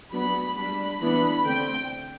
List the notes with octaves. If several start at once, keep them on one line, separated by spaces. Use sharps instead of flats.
F#3 B3 D4 B5
G3 D4 B5
E3 B3 D4 B5
D3 A3 C4 G5